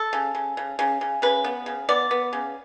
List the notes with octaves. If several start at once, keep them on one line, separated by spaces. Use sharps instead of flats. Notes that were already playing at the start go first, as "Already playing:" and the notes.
Already playing: A4
C#3
C#3
C#3
C#3
C#3
C#3 B4
B3
C#3
B3 D5
B3
C#3